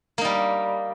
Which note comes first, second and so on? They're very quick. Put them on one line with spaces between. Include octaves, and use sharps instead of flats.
A#3 D#4 G3